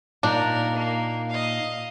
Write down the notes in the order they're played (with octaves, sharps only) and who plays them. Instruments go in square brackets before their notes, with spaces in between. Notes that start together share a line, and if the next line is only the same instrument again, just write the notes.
[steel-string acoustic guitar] A#2 D#4 [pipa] D4 [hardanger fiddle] A#4
[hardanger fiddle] A#3
D#5 F5